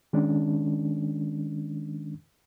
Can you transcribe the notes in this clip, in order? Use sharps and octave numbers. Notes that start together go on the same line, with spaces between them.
D#3 G#3 C#4 D4